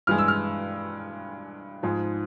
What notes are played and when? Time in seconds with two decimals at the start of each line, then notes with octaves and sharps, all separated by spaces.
0.07 G2 E3 G#3 F6
0.18 E6
0.28 F6
1.83 G#2 F3 G#3